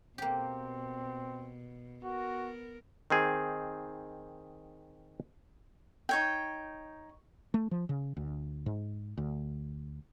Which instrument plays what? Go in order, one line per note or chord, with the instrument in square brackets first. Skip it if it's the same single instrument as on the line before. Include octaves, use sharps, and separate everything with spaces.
[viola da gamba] B2 [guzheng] A#3 G4 [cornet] C4
[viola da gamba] B3 A#4 [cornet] F#4
[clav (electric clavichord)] D#3 C4 G#4
[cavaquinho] D#4 C#5 G5
[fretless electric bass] A3
F3
C#3
D2
G#2
D2